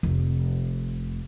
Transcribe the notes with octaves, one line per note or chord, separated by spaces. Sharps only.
F1